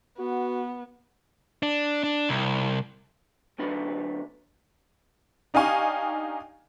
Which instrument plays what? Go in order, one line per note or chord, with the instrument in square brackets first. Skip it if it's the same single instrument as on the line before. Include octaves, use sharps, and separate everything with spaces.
[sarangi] B3 [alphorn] F#4
[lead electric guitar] D4
D4
C2
[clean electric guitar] D2 F#3 D4 B4 B5
[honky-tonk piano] D4 D#4 G4 F5 G#5 C#6